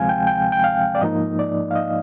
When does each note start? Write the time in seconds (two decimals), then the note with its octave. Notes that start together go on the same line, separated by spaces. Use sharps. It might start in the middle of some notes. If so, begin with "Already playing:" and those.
Already playing: D2 C3 F3 G#3 C4 F5 G#5
0.09 G5
0.27 G5
0.52 G5
0.64 F5
0.95 D5
1.01 G#2 F3 A#3 D#4 D#5
1.39 D5
1.71 F5
1.75 D#5